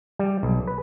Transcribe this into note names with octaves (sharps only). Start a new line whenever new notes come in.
G3
B1
B4